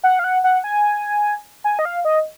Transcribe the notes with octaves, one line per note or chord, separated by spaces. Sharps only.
F#5
F5
F#5
F#5
G#5
G#5
D#5
F5
D#5